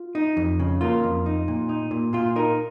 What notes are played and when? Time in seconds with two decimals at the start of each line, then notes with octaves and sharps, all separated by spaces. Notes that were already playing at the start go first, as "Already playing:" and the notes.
Already playing: F4
0.15 D#4
0.37 F2
0.60 C#3
0.81 A#3 F4
1.04 F2
1.26 D#4
1.48 A#2
1.69 D#4
1.91 A#2
2.13 A#2 F4
2.36 D#4 A#4